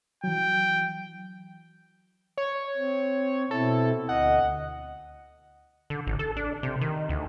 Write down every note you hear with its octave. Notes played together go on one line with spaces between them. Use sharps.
E3 F#3 G5
C#5
C4
B2 C4 E4 A4
D2 D#5 F#5
D3
A1
A4
D4
C3
D#3
D2